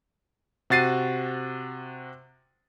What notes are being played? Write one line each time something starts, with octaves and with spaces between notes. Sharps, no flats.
C3 F#4 A6 C7 D#7